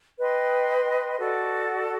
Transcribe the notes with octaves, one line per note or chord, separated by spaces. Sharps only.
B4 D#5 G5 C6
F#4 A4 D5